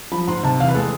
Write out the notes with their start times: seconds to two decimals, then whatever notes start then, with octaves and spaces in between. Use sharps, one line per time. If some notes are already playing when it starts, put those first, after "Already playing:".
0.12 F3 B5
0.27 G#2 C6
0.43 C3 A5
0.60 E2 F5
0.69 B4
0.75 G#3 A4